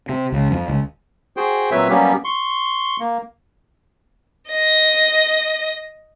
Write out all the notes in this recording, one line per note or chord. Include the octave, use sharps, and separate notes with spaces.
C3
C#2
F2
C#2
F#4 G#4 C5 G5
A#2 F#3 C4 B4 C#5 E5
F#3 G3 A#3 B3 C#4 G4
C6 C#6
A#3
D#5 A#6